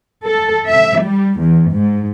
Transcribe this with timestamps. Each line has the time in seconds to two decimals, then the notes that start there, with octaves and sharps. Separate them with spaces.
0.24 A4
0.70 E5
1.02 G3
1.39 E2
1.74 G#2